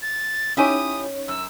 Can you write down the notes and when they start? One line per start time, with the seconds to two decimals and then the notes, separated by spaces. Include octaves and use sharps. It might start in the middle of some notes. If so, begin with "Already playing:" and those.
0.02 A6
0.57 C#4 D#4 E4 G4 C#5 G#5 D#6
1.28 F#2 E6